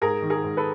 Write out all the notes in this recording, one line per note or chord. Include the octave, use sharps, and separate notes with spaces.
G#2 G#4 A#4
D#3
G#4 A#4
G#2
A4 B4